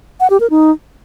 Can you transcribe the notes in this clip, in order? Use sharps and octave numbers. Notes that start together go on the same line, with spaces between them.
F#5
G4
A#4
D#4